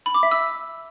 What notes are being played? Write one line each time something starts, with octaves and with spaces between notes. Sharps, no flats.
B5
D6
E5
E6